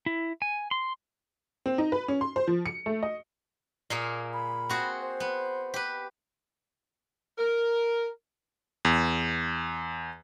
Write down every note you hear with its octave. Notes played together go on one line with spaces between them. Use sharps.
E4
G#5
C6
C4
D#4
B4
C#4
C6
C5
F3
C#7
A3
D#5
A#2 A#3 G#4
B5
C4 F#4 G#4
C5
B3
G4 B4
A#4
E2